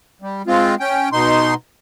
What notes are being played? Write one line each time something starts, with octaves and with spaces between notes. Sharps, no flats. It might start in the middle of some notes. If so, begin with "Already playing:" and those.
G3
G#3 C4 F4
C#4 G5
B2 D#4 C6